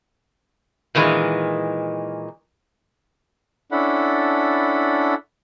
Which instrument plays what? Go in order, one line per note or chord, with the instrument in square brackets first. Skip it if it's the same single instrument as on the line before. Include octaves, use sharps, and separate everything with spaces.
[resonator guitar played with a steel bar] A#2 D#3 E3 G#3
[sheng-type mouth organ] C#4 D4 E4 A4 F#5 B5